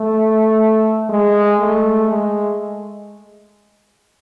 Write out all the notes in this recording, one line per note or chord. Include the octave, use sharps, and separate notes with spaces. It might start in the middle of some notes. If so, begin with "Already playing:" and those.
Already playing: A3
G#3
A3
G#3